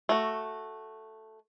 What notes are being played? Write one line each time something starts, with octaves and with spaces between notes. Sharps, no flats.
A3 F#4